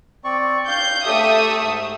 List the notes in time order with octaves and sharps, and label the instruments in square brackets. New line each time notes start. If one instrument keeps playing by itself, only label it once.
[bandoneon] C4 D5 C#6
[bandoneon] F5 [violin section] G6
[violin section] A3 E5 D#6 [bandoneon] G4 A4
[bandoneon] G#2